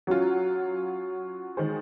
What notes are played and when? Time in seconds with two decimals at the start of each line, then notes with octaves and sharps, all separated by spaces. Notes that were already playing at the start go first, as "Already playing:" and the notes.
0.07 F#3 C#4 F4 F#4
1.57 D#3 G#3 D#4 G#4 C5